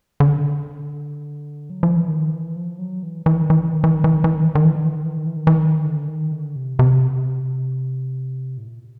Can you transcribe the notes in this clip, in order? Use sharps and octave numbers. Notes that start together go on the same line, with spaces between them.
D3
F#3
F3
E3
D#3
E3
F3
F#3
E3
E3
D#3
E3
D#3
E3
D#3
E3
D#3
E3
D#3
E3
D#3
E3
D#3
E3
D#3
E3
D#3
E3
D#3
E3
D#3
D3
D#3
D3
C3
C3
A2
A#2